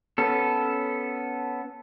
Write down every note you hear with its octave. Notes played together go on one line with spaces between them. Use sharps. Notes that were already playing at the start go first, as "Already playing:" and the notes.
B3 C#4 A4